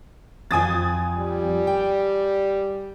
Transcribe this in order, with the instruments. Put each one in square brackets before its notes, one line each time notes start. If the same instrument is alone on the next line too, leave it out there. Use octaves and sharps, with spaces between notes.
[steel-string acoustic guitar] F2 F3 [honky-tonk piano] G#5 D#6 A6
[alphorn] G3
[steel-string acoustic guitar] G5